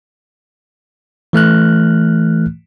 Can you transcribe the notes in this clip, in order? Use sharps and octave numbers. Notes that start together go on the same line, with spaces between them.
E3 A3 F6 F#6